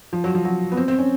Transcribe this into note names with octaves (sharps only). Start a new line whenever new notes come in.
F3
F#3
F3
F#3
B3
C4
C4
C#4